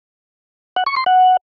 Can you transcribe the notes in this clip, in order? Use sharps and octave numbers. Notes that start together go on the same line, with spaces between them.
F#5
C#6
C6
F#5